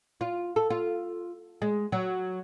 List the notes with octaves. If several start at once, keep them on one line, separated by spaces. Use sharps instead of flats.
F4
A4
F4
G#3
F#3